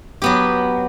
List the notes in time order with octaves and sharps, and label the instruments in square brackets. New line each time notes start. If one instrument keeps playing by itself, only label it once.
[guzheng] F#3 B3 G4